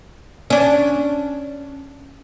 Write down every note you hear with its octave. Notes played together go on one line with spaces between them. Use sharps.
C#4 D4